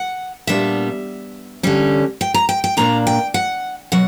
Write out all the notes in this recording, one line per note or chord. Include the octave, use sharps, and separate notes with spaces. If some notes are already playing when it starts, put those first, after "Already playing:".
Already playing: F#5
A#2 G3 B3 D4 E5
D3 G3 C#4
G5
A#5
G5
G5
A#2 A#3 D4 A#5
G5
F#5
B2 F#3 F#5